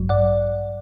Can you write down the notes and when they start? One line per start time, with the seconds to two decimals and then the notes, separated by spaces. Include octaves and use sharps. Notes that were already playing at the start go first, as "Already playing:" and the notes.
Already playing: A1 G2 F#3
0.09 D5 F#5